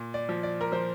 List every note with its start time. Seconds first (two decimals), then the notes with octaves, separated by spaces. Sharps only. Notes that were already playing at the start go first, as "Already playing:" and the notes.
Already playing: A#2
0.14 D5
0.29 F3
0.43 D5
0.61 A#4
0.72 F3 C5